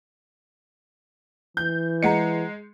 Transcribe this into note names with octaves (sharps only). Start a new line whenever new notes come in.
E3 G6
G#3 D#5 F#5 A#5 C#7